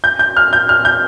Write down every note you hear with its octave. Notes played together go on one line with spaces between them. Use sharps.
G6
G6
F6
G6
F6
G6